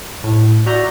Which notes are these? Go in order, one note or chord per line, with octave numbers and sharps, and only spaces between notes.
A2
F#4 D5 E5 A#5 G6